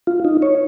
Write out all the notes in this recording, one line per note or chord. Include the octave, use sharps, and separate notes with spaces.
F4
D#4
C#5